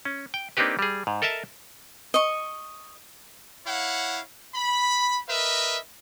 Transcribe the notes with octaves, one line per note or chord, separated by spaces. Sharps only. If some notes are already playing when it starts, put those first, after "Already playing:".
C#4
G5
A#3 C4 D4 D#4 G4 B4
G3 G#4
G#2
A4 A#4 D#5 E5 A5
D#5 C#6
E4 C#5 F5 F#5
B5
A#4 B4 D#5 E5